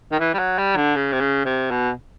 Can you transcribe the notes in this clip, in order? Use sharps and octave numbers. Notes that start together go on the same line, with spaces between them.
D#3
E3
G3
F#3
G3
D3
C#3
C3
C#3
C3
B2